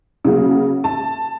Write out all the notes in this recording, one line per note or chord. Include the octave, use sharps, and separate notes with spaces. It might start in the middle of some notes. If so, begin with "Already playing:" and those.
C#3 F#3 A#3
A5